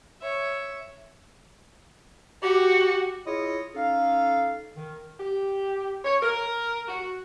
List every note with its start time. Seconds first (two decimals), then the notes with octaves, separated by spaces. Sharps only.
0.23 C#5 E5
2.43 F#4 G4
3.26 E4 F4 G#4 C#5 D#5
3.75 C#4 D#4 A4 F5
4.76 D#3
5.20 G4
6.05 C#5
6.23 A#4
6.88 F#4